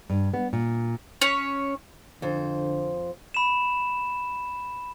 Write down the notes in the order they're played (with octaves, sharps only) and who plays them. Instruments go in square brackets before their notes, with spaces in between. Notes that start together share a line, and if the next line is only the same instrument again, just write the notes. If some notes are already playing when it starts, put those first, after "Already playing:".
[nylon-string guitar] G2
B3
A#2
[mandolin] C#4 C#5
[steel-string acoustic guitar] F2 C5 [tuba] D3
[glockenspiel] B5 E7